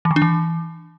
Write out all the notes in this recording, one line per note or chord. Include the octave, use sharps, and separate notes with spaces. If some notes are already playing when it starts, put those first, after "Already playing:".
E3
D#3
D4
E3